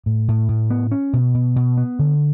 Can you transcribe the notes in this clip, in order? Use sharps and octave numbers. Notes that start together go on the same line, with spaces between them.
A2
A2
A2
B3
C#4
B2
B2
B2
B3
D3